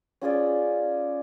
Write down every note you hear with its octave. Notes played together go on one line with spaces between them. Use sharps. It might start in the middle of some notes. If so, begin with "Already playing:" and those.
C#4 F4 G#4 D5